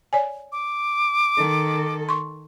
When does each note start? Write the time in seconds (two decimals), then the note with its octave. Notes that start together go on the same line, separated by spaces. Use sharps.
0.13 C#5 D5 G#5
0.52 D6
1.37 D#3 A4
2.09 C6 C#6